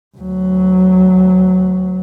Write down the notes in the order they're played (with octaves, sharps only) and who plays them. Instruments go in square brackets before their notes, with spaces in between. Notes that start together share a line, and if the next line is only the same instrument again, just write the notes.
[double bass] D2 F#3